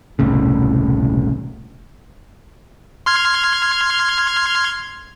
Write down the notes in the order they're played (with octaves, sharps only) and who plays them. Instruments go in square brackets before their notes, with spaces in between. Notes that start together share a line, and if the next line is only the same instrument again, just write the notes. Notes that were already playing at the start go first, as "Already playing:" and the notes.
[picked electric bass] E1 C2 A2 C#3
[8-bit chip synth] C6 F6 G#6